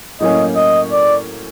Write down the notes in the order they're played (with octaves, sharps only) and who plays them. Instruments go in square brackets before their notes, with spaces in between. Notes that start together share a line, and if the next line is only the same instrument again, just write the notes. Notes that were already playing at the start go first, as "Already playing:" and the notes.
[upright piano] A2 F#3 A#3 C#4 [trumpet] D#5
[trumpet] D#5
D5